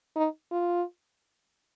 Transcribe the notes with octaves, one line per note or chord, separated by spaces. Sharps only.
D#4
F4